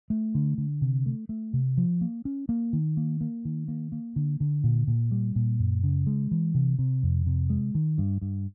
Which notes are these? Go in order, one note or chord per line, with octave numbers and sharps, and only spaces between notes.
A3
D3
D3
C3
A3
A3
C3
F3
A#3
C#4
A#3
D#3
A#3
A#3
D#3
A#3
A#3
D3
D3
A#2
A#2
G3
A#2
F#2
C#3
G#3
E3
C3
C3
F2
C3
G#3
D#3
G2
G2